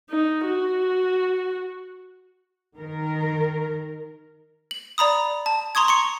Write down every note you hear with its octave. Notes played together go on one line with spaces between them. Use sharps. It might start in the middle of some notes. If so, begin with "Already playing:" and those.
D#4
F#4
D#3 A#4
F#7
D5 A#5 B5 D#6
A5
A#5 C6 C#6 D#6 G#6
C6 C#6 C#7